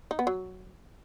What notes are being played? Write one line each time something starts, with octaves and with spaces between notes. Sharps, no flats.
D#4
B3
F#3